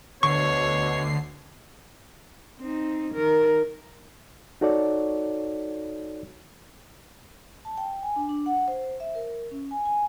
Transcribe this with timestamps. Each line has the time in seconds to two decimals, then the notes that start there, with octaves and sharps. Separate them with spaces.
0.23 D2 B2 D3 C#5 C#6 C7
2.60 C4 D#4
3.14 D#3 A#4
4.61 D#4 F#4 A4 C#5 D5
7.65 A5
7.78 G5
8.03 G#5
8.16 D4
8.29 D4
8.46 F#5
8.68 C5
9.00 E5
9.15 A#4
9.51 C#4
9.71 G#5
9.86 G#5